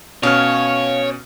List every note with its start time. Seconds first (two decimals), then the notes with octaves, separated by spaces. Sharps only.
0.23 B2 C#4 C#5 F5 F6